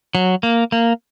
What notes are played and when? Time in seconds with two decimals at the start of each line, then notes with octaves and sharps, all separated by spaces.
0.15 F#3
0.43 A#3
0.72 A#3